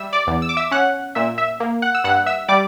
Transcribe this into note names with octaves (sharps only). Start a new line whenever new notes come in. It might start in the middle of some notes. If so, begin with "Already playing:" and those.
Already playing: G3 E5 E6
D5 D6
E2
E6
D6
E5 E6
C#4 F#5 F#6
A#2 E5 E6
E5 E6
A#3
F#5 F#6
E6
G2 F#5 F#6
E5 E6
G3 D5 D6